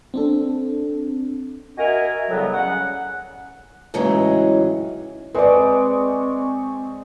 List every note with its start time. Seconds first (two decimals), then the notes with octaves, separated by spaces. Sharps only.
0.14 C4 D4 A4
1.78 F#4 A#4 D#5 E5 G#5
2.29 A2 C#3 F#3 G3 B3
2.54 C#3 C#4 F#5
3.94 A2 C#3 E3 F#3 G#3 D#4
5.34 G#3 C4 G#4 B4 D5 C#6 D6